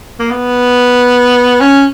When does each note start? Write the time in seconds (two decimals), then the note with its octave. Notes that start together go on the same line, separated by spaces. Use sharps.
0.19 A#3
0.30 B3
1.60 C#4